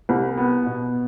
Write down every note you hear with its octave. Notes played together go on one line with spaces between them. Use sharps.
C2
B3
B2